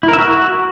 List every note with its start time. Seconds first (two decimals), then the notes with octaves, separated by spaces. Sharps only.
0.03 E4
0.08 A#4
0.13 E5
0.18 F#4